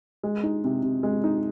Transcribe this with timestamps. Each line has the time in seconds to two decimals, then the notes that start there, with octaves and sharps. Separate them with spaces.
0.23 G#3
0.43 D#4
0.64 C3
0.83 C3
1.03 G#3
1.24 D#4